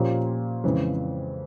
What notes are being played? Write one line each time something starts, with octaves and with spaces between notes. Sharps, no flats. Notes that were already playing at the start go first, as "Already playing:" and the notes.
Already playing: A#2 F3 A#3 C#4 G4
F2 C#3 E3 G#3